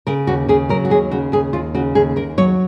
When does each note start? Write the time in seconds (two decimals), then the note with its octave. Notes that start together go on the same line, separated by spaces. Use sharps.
0.07 C#3 A#4
0.27 D#2 F#4
0.48 C#3 G#4
0.69 F#3 A#4
0.85 F#4
0.90 D#2 G#4
1.11 C#3 F#4
1.32 D#2 G#4
1.53 D#2 F4
1.74 C#3 F#4
1.95 D#2 G#4
2.16 D#2 A#4
2.38 F#3 C#5